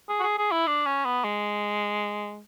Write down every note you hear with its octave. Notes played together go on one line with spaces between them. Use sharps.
G#4
F#4
G#4
G#4
E4
D4
C#4
B3
G#3